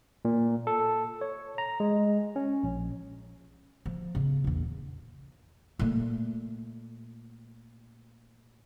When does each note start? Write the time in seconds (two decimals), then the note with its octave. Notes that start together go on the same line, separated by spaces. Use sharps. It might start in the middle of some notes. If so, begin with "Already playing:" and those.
0.25 A#2
0.67 A4
1.21 C#5
1.58 A#5
1.80 G#3
2.36 C#4
2.63 A#1
3.86 F3
4.15 C#3 B3
4.44 A#1 E2
5.79 A#2 A3